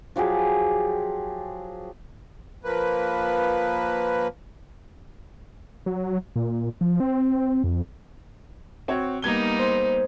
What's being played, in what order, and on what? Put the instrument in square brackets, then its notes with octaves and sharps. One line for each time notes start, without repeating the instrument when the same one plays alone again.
[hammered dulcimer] F3 F#3 G4 G#4
[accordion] F3 A#3 B4
[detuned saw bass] F#3
A#2
F3
C4
F2
[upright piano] C4 F#4 C#5
[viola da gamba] G3 A#3 D#4 [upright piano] B3 G#6 G7
[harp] C5